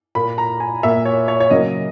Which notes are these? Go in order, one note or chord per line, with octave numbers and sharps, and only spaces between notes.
A#2 A#3 B5
A#5
G#5
A#2 A#3 E5
C#5
C#5
C#5
C#3 F#3 A#3 D#5